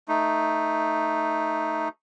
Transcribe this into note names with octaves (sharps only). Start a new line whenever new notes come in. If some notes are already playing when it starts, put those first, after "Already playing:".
A3 D#4